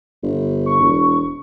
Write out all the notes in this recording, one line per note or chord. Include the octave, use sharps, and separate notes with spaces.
G1
C#6
E1